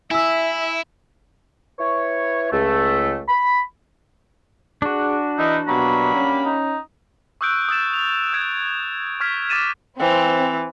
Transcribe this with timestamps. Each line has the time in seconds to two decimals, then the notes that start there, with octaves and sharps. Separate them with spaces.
0.11 E4 E5 G#5 E6
1.79 E4 B4 C#5
2.52 C#2 A3
3.28 B5
4.82 D4 F#4 G#4
5.38 E3 D#4 E4
5.68 B2 F#3 G3 A#3 B5
6.16 C#4
6.45 D#4
7.41 C#6 D#6 E6 F#6 G6 D7
7.68 D#6 E6 A6 E7
7.94 F7
8.33 E6 G#6 D7
9.20 C#6 F6 G#6 B6
9.50 D6 G#6 A6 D#7 E7
9.99 E3 C4